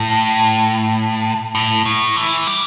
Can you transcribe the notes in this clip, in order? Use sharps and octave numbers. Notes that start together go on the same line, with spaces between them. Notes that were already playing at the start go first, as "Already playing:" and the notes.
Already playing: A2
A2
A2
E3
G3